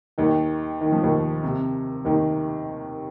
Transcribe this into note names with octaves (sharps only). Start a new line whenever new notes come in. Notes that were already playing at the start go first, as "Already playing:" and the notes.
D#2 D#3
D#3
F3
D#2 D#3
C3
D#2 D#3